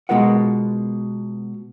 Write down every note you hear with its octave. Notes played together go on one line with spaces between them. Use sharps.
B2 G#3 F4 A#4 B4 F#5